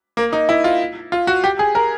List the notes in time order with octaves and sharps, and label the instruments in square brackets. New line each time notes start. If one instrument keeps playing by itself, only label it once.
[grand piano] A#3
D#4
E4
F4
F4
F#4
G4
G#4
A#4